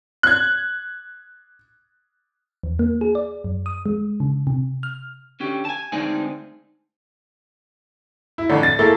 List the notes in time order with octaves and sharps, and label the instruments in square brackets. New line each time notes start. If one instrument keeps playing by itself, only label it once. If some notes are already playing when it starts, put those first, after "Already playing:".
[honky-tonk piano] F#6 G#6
[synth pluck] E2
A#3
G#4
D5
F#2
D#6
G#3
C#3
C3
F6
[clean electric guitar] D3 C#4 G4
G#5 A5
D2 G#3 C4 D4 D#4 G#5
[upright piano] E4
F2 A2 D3
A6
A3 A#3 E4 G#4 A4